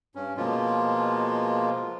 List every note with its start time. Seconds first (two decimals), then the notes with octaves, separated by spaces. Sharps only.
0.15 G2 C#4
0.37 B2 F3 G#3 A#3 F4